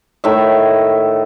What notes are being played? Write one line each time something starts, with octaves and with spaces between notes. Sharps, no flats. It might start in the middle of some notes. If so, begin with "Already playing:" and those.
A2 D#3 E5